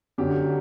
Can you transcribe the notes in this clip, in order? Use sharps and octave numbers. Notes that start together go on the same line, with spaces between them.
F#2 D3 F#3 G4